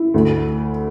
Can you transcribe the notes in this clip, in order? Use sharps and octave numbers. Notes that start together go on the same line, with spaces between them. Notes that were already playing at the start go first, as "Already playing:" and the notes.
Already playing: E4
D2